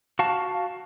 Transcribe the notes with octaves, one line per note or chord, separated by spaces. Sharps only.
F#4 F5 A5